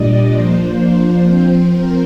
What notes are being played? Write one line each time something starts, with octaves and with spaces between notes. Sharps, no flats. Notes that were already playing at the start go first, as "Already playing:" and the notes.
Already playing: A#2 G3 D4 D5 D#5
F3 A#3 D4 C5
F3 C4
A#4